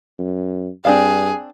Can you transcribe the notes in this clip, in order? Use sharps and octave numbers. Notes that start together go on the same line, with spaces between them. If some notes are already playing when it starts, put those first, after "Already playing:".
F#2
G2 C4 D4 G#4 F5